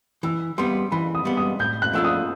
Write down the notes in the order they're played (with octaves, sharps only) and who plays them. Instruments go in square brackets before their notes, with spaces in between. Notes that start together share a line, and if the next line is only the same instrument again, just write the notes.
[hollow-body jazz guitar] E3 [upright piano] E6
[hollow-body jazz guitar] G3 B3 [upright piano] C6
[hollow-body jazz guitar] E3 [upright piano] B5
[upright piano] D#6
[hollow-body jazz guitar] G3 B3
[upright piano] D#6
[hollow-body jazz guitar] A2 [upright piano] G6
[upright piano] F#6
[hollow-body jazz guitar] F3 A3 D4 F4 [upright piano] E6
[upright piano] D#6